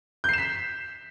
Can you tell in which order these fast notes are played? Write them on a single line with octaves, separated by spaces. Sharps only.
G6 C7 E7 B6